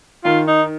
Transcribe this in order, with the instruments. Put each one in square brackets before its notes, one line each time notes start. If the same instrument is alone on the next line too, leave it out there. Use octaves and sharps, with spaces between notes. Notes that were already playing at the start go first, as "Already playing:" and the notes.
[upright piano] D#3 [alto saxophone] F4
[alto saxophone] D#4